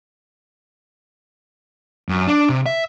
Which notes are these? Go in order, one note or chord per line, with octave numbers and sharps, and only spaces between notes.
F#2
D4
C3
E5